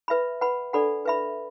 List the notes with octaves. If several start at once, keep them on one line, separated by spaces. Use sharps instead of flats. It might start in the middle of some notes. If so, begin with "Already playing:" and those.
B4 E5 B5
B4 F#5 B5
D4 A4 D5 F#5 B5
B4 E5 B5